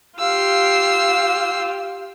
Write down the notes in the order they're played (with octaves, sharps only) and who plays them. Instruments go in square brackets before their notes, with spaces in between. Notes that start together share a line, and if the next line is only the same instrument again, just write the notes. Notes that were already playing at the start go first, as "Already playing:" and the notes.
[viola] F4 G4 [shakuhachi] F5 [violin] E6 C7